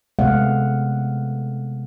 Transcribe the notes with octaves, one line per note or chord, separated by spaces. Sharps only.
C3 G#3 A3 B3 F5 F#5